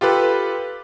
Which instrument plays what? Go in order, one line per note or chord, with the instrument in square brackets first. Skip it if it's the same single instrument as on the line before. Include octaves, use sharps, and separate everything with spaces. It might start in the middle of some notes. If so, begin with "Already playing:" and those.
[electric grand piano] F4 G4 A4 B4